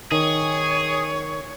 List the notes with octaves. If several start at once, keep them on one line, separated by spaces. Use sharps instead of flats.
D#3 G#4 C#5